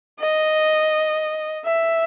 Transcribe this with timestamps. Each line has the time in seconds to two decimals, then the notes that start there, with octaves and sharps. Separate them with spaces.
0.20 D#5
1.64 E5